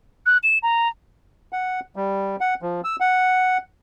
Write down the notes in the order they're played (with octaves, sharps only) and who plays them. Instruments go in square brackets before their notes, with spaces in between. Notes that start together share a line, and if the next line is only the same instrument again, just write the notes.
[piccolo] F#6
E7
A#5
[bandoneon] F#5
G3
F#5
F3
E6
F#5